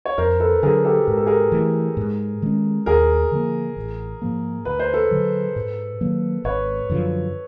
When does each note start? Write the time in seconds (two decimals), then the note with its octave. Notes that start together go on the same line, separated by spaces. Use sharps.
0.05 C#5
0.18 F2 A#4 C5
0.40 A4 B4
0.63 D3 F#3 G#4 A#4
0.85 G4 A4
1.07 G#2 A#4
1.17 A4
1.26 G#4 A#4
1.52 E3 A3
1.97 G#2
2.42 D#3 G#3 C#4
2.86 D#2 G#4 A#4
3.32 D3 F3 A#3
3.77 A1
4.22 G#2 F3 A#3
4.65 D2 B4
4.79 C5
4.93 A4 B4
5.11 D3 F#3
5.56 G#2
6.01 D#3 F#3 A#3
6.44 G#1 B4 C#5
6.90 F#2 D3 F3